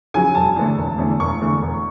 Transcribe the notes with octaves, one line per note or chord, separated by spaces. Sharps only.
C#3 F#3 G#5
E1 A5
E2 D3 A3
E1
E2 D3 A3
E1 C#6
E2 D3 A3
E1